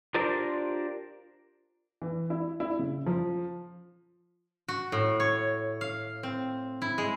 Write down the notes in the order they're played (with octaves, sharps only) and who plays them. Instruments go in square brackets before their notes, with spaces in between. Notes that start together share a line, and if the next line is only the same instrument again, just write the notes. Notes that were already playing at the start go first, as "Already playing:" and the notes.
[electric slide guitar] D4 F4 G4 A#4 C5 D5
[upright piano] E3
E4
E4
C#3
F3
[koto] F#4
A2
C#5
F5
C4
E4
G#3